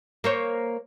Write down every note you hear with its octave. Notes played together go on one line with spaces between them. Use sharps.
A#3 C5 C#5